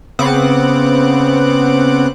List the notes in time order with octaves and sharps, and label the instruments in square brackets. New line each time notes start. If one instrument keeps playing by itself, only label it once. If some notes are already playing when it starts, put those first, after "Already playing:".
[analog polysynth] C#3 B3 C4 F#5 D6 F#6